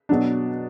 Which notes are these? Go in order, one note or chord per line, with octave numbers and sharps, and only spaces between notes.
B2 F#3 D4